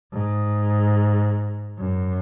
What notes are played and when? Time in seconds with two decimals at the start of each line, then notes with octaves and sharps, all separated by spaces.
0.13 G#2
1.79 F#2